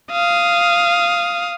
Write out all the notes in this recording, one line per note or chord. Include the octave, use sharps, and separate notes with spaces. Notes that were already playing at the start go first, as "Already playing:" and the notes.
F5 D#6